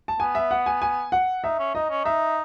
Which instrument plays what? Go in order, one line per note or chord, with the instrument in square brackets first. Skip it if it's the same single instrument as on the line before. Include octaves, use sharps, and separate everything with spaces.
[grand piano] A5
[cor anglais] B3 [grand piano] G#5
[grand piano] E5
F#5
G#5
G#5
F#5
[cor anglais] D#4 [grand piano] E5
[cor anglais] C#4
[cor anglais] D#4 [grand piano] D#5
[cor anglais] C#4
[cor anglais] D#4 [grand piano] E5